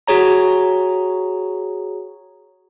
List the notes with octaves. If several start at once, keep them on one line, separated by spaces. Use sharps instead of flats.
F#4 G#4 C#5 A#5